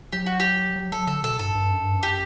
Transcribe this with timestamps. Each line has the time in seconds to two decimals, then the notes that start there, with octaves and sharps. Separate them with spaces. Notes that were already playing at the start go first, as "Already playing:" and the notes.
0.13 F#3 G4
0.26 F#4
0.40 G4
0.76 F#3
0.92 F#3 A4
1.07 D3 A4
1.23 B2 A4
1.39 G2 A4
1.55 G2
1.71 F#2
1.84 G2
1.96 F#2
2.03 G4